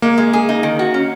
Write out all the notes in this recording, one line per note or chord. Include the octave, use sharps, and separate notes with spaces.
G#3 A#3
G#3
G#4
D#4
D#3
F#4
C#4